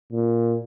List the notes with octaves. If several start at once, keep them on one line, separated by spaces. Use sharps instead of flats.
A#2